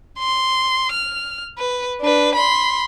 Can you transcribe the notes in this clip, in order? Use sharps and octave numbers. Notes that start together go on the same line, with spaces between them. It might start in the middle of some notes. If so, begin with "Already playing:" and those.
C6
F6
B4
D4 B4
B5 C6